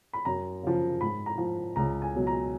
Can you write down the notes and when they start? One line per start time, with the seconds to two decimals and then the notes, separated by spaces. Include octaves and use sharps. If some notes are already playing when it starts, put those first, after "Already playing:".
0.13 B5
0.25 F#2 A#5
0.63 C#3 F3
1.01 G#2 B5
1.26 A#5
1.38 F3
1.76 C#2 A#5
2.02 G#5
2.14 B2 F#3
2.27 A#5